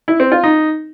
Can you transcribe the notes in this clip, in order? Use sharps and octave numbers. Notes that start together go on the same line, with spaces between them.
E4
C4
F4
D#4